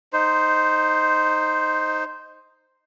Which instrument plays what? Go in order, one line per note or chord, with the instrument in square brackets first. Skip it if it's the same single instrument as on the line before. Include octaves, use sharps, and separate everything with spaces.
[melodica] D#4 C5